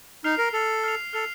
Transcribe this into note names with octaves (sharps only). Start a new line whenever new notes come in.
D#4 F6 C7 F7
A#4
A4 F6 C7 F7
F6 C7 F7
A4 F6 C7 F7